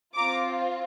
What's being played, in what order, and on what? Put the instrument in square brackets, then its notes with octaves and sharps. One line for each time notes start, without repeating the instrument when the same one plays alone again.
[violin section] C4 F4 A#5 D6